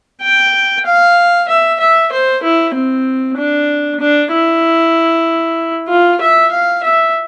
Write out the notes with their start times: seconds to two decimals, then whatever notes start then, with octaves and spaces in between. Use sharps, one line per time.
0.22 G5
0.86 F5
1.48 E5
1.80 E5
2.12 C5
2.43 E4
2.74 C4
3.37 D4
4.00 D4
4.31 E4
5.88 F4
6.21 E5
6.52 F5
6.83 E5